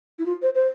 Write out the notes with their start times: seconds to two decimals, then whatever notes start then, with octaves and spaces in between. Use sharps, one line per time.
0.18 E4
0.25 F4
0.41 C5
0.54 C5